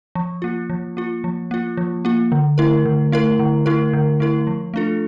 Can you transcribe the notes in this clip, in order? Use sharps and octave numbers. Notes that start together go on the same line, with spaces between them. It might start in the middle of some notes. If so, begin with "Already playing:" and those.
F3
A#3 F4
F3
A#3 F4
F3
A#3 F4
F3
A#3 F4
D3
A3 E4 A#4
D3
A3 E4 A#4
D3
A3 E4 A#4
D3
A3 E4 A#4
F3
A3 D4 F4 A4